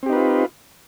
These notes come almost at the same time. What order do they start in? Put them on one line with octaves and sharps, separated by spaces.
C4 G4 D#4 B4 F4